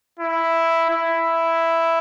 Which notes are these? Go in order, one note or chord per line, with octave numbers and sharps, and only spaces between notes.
E4
E4